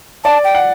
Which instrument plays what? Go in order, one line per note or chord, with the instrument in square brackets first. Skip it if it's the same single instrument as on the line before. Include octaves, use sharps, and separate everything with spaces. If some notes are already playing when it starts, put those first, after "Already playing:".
[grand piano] D5 [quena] A5
[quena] G5
[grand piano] F#5